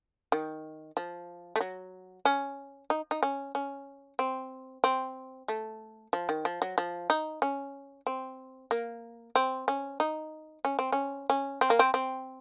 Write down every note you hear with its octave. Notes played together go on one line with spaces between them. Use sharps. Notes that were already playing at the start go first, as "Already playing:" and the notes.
D#3
F3
A3
F#3
C#4
D#4
D#4
C#4
C#4
C4
C4
A3
F3
D#3
F3
F#3
F3
D#4
C#4
C4
A#3
C4
C#4
D#4
C#4
C4
C#4
C#4
C4
A#3
C4
C4